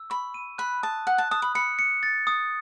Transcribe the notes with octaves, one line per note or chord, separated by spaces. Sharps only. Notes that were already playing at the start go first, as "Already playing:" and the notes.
Already playing: E6
B5 C#6
D#7
B5 F#6
A5 D#6
F#5 F#6
A5
A5 D#6
B5
B5 C#7
C#7
A6
D#6